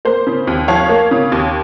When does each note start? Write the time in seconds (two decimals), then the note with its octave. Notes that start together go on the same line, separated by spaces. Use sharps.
0.05 A#3 C5
0.27 C#3
0.47 D#2
0.68 F3 C#5 F5
0.89 A#3
1.11 C#3
1.32 D#2